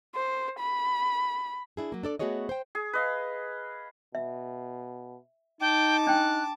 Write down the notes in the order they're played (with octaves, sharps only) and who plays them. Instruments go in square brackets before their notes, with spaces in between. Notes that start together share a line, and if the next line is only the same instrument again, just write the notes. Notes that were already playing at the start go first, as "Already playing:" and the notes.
[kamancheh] C5
B5
[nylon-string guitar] D4 E4 G#4
F#3 A#3
D4 A4 D5
A3 B3 F#4 G#4 C#5 D#5
C5 G5
[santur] G#4
B4 D#5 F5
[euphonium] B2 [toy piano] E5
[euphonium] D#4 [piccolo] G5 [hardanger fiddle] A5 D6
[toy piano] D4 G5 [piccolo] F#6